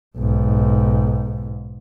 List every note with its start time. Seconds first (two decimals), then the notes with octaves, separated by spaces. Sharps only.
0.18 B1 G#2